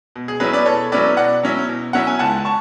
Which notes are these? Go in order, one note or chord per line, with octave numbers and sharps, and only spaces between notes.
B2
G#4
F#3 C#4 E4 G#4 B4
B4 D5
B2 A4 C#5
F#3 C#4 E4 B4 D5
B2 D5 F#5
F#3 C#4 E4
B2
F#3 C#4 E4 F#5
G#5
C#2 F#5 A5
A5 C#6